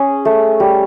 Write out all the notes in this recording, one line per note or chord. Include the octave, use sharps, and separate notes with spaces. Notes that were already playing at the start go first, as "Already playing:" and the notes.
Already playing: C#4 G#4
A3
G3